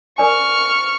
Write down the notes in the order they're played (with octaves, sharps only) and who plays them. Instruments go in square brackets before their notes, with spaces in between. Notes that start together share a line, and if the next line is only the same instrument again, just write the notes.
[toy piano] A#4 D5 G#5 [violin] C#6 F6